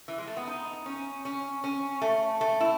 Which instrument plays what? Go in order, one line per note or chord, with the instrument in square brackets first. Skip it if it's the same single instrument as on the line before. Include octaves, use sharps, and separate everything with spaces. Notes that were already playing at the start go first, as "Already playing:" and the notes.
[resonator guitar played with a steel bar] E3
G#3
A3
B3
D#4
C#4
C#4
C#4
A3
A3
E4